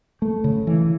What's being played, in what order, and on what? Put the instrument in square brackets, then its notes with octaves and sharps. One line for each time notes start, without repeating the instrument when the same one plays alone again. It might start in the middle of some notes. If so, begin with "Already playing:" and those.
[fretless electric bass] A3
C#3
E3